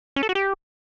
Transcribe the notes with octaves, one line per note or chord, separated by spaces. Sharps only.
C#4
A4
F#4
G4